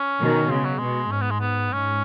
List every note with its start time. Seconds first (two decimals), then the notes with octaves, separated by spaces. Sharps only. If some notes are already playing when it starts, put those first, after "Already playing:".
Already playing: C#4
0.21 B2 D#3
0.50 C#3 G#3
0.64 F#3
0.78 B2 G#3
1.11 G#2 C#4
1.22 B3
1.31 G#3
1.41 B3
1.73 G#2 C#4